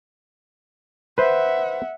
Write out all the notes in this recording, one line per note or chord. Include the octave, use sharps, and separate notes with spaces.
B4 C5 E5 F#5